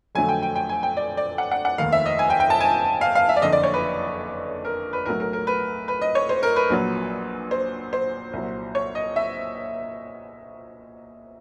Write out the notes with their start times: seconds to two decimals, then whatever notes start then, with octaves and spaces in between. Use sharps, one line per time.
0.15 F2 D3 F#3 A3 G#5
0.29 G5
0.42 G5
0.56 G5
0.69 G#5
0.83 G5
0.97 D5
1.17 D5
1.38 F#5
1.52 F#5
1.65 F#5
1.78 F1 D#2 D#3 F5
1.92 E5
2.06 D#5
2.19 G#5
2.30 G5
2.40 G5
2.50 A5
2.60 G#5
3.01 F5
3.15 F5
3.29 E5
3.36 D5
3.42 F#1 F2 D3 D#5
3.52 D5
3.63 C#5
3.74 B4
4.65 A#4
4.93 B4
5.06 B1 A2 F#3 A3 A#4
5.20 A#4
5.33 A#4
5.47 B4
5.88 B4
6.01 D#5
6.15 C#5
6.29 C5
6.43 A#4
6.56 B4
6.70 A#1 A#2 F#3
7.51 C5
7.93 C5
8.33 C2 A#2 F#3
8.75 C#5
8.95 D#5
9.16 E5